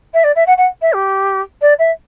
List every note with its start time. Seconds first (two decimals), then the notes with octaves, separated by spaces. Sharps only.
0.14 E5
0.24 D5
0.36 E5
0.47 F#5
0.58 F#5
0.82 E5
0.93 G4
1.62 D5
1.79 E5